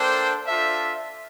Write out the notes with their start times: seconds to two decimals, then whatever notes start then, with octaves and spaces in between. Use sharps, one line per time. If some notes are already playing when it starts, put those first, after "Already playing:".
Already playing: A#3 D4 A4 C5 G5
0.47 D4 F4 A4 E5